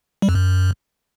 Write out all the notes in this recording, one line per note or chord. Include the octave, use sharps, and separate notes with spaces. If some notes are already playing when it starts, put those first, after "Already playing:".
G3
F2
F#2